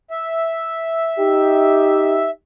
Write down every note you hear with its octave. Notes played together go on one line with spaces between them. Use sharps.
E5
D#4 G4